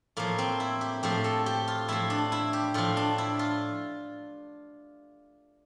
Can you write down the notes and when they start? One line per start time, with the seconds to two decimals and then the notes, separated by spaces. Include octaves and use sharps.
0.17 A2 F3 A#3
0.38 C4
0.60 E4
0.81 G4
1.03 A2 F3 G4
1.24 A4
1.46 G4
1.68 F4
1.88 A2 F3 E4
2.10 D4
2.32 E4
2.53 G4
2.74 A2 F3 F4
2.97 D4
3.18 E4
3.39 F4